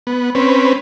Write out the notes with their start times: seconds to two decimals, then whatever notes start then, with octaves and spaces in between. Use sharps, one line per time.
0.07 B3
0.35 C4 C#4 B4